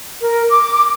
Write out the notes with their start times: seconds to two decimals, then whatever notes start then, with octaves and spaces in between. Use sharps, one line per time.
0.21 A#4
0.49 D6